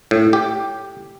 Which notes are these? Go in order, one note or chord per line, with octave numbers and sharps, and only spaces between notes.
A2
G4